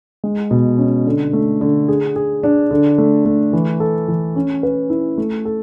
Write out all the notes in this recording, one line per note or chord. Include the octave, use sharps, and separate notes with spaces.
G#3
B2
C#4
D3
A3
D3
G#4
G#4
D4
D3
A3
A3
E3
A4
E3
C#4
B4
E4
A3
A4